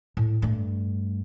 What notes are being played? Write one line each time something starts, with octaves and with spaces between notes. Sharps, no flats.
A2
G2 A3